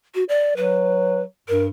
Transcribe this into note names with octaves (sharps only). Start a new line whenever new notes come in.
F#4
D5
F#3 B4
G2 A#4